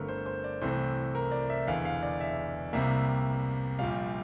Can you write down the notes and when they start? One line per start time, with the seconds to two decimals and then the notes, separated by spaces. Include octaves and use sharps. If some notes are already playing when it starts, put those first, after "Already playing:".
Already playing: G1 G2 D3 A3 C4 A#4
0.08 C5
0.26 C5
0.44 D5
0.61 C2 C3 E3 A3 C4 C5
1.15 A#4
1.32 D5
1.50 E5
1.67 E1 E2 D3 F5
1.85 F5
2.03 D5
2.20 E5
2.73 C2 C3 G3 A#3 E5
3.79 A#1 A#2 G3 F5